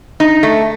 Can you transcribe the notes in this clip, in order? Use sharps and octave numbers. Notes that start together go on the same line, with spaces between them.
D#4
A3